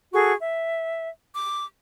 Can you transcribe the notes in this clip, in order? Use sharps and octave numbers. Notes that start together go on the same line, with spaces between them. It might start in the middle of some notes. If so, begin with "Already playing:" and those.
F#4 G#4 A4 C#6
E5
D6